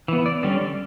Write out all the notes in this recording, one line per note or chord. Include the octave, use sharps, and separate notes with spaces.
E3 B3
D5
D3 G3 C#4 D5